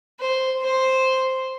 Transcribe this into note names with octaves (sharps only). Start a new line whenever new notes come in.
C5
C5